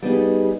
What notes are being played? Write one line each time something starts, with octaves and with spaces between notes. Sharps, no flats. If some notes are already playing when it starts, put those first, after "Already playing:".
G3 B3 D#4 G#4